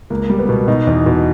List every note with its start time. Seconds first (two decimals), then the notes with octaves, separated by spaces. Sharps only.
0.10 C#2 A#3
0.30 G3
0.39 B3
0.49 B2
0.68 B2 D#4
0.87 E2
1.06 B2